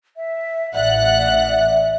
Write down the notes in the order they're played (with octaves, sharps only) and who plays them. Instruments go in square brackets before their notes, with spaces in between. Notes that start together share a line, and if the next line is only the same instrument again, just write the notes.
[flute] E5
[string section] A1 F#5 F#6 [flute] D5 [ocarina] E5